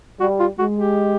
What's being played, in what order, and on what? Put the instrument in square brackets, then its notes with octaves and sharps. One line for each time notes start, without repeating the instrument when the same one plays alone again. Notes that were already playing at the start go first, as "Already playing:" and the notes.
[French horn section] G3 [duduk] F#4
[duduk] F4
[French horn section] G#3 [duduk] F#4
[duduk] G4